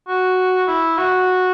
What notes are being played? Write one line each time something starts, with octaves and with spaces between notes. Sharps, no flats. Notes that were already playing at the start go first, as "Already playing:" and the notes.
F#4
E4
F#4